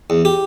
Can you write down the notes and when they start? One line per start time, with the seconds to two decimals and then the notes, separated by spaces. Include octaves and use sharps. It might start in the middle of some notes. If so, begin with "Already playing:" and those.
0.10 E2
0.25 G4